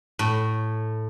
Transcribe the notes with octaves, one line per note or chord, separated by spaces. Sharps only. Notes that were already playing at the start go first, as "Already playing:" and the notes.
A2